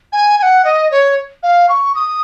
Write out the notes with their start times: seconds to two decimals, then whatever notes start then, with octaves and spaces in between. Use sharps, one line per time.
0.12 G#5
0.39 G#5
0.42 F#5
0.65 D#5
0.91 C#5
1.43 F5
1.69 C#6
1.95 D#6